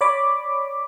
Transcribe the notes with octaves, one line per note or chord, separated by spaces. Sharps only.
C#5 D5 B5 D6